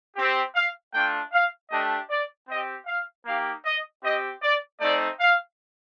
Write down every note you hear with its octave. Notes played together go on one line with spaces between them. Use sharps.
C4 G4
F5
A3 D4 F4 G5
F5
A3 D4 G4 D#5
D5
C4 G4 D#5
F5
A#3 D#4 G4 F5
D#5
C4 G4 D#5
D5
A3 C4 D#4 D5
F5